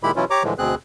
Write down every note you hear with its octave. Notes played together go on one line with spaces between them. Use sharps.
A#2 D#3 G#3 E4 G4 B5
B2 E3 F#3 C#4 E4 F4
G4 C#5 A#5 D6
A2 D3 E3 F3 G#3
D2 B2 C4 G#4 F#6